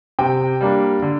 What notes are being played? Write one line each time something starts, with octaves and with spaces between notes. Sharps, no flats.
C3 G5
G3 A#3 D4
D3